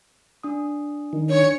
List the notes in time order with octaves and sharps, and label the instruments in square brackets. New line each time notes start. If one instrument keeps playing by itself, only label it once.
[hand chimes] D4 D#6
[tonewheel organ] D#3
[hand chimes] D4 C#6 [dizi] C#5